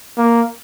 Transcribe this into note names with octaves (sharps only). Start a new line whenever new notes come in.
A#3